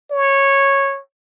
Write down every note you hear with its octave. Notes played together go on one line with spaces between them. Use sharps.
C#5